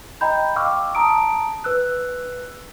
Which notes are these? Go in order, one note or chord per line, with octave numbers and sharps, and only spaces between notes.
D#5 G5 A#5 B5 G6
F5 G5 C#6 D6 E6 F6
A5 A#5 D#6 D7
B4 E6 F#6